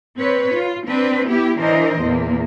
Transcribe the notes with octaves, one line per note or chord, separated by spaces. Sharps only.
C4 B4 C#5
F4
C4 D4 B4
B3 E4 G4
E3 D4 A#4 C5 D#5
E2 A#2 A#3